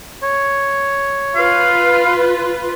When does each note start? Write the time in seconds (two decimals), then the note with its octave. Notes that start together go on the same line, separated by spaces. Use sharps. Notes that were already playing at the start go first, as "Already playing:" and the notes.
0.23 C#5
1.36 F4 B4 F5